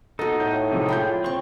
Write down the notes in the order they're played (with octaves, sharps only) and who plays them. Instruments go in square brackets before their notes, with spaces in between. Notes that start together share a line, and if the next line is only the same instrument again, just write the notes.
[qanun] B3 F#4 [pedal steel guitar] D#4 [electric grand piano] A4
[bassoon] A2 [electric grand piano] G6
[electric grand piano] C3 F3 G#3
[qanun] F4 G#4 D5 [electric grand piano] G5 B5 G6
[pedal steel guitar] C4 [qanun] C#5 C#6